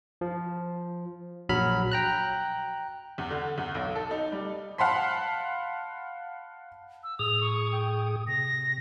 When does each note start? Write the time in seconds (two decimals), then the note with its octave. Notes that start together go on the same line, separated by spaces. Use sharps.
0.21 F3
1.49 A#1 F#3 B5 F6
1.92 G5 A#5 F#6
3.18 E2
3.30 D3
3.58 E2
3.75 B1
3.95 A4
4.11 D#4
4.32 G3
4.78 F5 F#5 A5 B5 C6 B6
7.04 E6
7.19 A2 G#4 D#6 F7
7.41 C#6
7.72 G5
8.27 C3 A#6